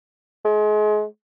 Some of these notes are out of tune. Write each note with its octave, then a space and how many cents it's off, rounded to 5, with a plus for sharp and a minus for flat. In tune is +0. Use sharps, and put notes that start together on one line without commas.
G#3 +30